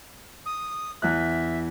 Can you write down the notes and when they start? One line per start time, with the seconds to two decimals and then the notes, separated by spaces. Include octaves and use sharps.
0.46 D#6
1.02 E2 E5 F#6